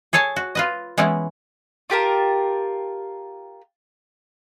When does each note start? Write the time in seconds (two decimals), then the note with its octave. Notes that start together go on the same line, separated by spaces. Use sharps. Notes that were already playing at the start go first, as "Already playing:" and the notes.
0.13 G#4 A4 C#5 G#5 A5
0.36 F#4
0.55 F4 B4 D#5
0.97 E3 G#3 B3 C#4 E4
1.90 F4 G4 A#4 A5